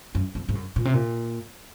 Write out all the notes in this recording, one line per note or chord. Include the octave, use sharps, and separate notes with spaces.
F#2
F2
G#2
F#2
A#2
C3
A#2